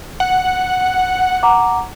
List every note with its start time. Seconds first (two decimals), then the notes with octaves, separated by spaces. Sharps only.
0.20 F#5
1.43 F#5 A#5 D6